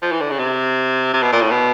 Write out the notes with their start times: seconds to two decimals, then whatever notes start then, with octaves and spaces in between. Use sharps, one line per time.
0.02 F3
0.12 E3
0.21 D3
0.31 C#3
0.39 C3
1.13 C3
1.22 B2
1.32 A#2
1.41 A2
1.51 B2